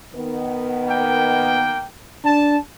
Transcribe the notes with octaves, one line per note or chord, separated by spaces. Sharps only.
D#3 B3
A#3 G5
D4 A5